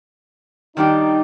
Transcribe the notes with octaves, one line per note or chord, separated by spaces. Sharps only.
D#3 G3 D4 D#4 G4